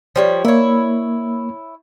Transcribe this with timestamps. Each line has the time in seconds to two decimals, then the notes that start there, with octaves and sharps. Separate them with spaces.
0.16 F3 G3 C#5
0.45 A#3 E4 C#5